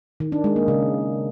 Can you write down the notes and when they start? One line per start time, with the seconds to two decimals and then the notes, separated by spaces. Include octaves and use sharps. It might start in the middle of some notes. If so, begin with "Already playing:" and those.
0.20 D#3
0.32 D4
0.44 G#3
0.56 A#3
0.68 C#3